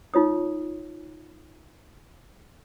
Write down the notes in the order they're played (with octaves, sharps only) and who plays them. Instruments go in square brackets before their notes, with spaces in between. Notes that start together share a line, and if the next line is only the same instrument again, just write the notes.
[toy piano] D#4 F4 C#5 D#6